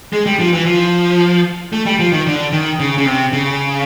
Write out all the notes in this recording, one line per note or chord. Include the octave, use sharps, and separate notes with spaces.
G#3
G3
F3
E3
F3
A3
G3
F3
D#3
D3
D#3
C#3
C#3
C3
C#3